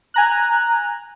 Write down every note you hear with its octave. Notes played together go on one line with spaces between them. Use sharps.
G#5 A#5 F#6